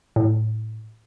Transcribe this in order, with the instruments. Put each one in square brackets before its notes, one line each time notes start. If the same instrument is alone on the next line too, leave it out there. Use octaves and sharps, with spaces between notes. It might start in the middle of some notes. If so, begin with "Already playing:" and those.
[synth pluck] A2